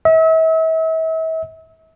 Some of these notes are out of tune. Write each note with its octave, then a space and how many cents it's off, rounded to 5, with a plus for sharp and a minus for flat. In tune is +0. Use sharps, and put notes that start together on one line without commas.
E5 -40 E6 -35